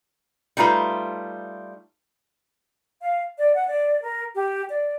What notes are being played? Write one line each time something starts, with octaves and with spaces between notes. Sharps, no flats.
G3 A3 D#4 F4 B4
F5
D5
F#5
D5
A#4
G4
D5